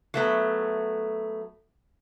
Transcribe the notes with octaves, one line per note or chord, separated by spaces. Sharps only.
F#3 A3 B3